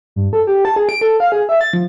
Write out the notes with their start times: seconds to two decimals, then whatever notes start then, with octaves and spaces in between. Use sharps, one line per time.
0.16 G2
0.33 A4
0.47 G4
0.65 A5
0.76 G#4
0.89 D7
1.01 A4
1.20 F5
1.32 G#4
1.49 E5
1.61 A6
1.73 F3